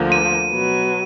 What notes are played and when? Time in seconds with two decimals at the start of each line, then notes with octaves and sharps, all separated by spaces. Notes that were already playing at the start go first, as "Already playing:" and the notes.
Already playing: D2 D3 F3 A#3
0.12 D#7
0.49 B2 F#3 B3